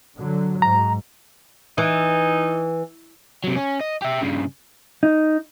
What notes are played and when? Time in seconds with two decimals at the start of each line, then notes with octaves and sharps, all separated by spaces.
0.17 D3 F#3
0.62 G#2 A#5
1.78 E3 D#4
3.44 C3 F#3
3.56 C#4
3.81 D#5
4.02 G4 E5
4.21 G2 C#3
5.03 D#4